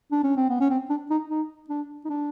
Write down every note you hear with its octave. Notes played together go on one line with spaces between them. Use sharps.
D4
C#4
C4
B3
C#4
C4
D4
D#4
D#4
D4
D#4
D4